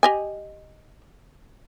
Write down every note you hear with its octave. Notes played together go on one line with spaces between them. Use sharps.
G4 D#5 G#5